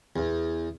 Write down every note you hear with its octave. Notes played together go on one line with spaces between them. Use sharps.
E2